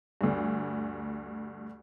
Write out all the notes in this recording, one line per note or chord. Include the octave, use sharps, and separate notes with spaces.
D2 G2